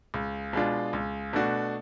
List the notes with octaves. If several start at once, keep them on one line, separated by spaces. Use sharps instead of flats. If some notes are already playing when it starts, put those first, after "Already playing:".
C#2
B2 G#3 D4 F4
C#2
B2 A3 D4 F#4